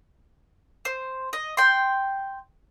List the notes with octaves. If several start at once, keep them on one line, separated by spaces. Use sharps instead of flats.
C5
D#5
G5 C6